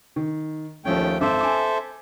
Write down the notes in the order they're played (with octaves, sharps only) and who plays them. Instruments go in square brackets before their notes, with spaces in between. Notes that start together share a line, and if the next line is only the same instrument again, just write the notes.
[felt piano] D#3
[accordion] D#2 A3 G5 [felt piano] F3 C#4
[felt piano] G#1 D6 [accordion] A4 C5 E5
[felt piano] G#5 D6